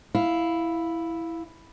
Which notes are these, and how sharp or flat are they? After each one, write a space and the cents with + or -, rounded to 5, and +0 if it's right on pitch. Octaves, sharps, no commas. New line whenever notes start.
E4 +0 F5 +0